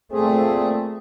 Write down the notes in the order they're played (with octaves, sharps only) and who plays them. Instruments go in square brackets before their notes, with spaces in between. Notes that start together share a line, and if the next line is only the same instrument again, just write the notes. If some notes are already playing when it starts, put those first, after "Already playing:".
[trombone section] A#2 C4 [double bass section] A3 [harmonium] G#4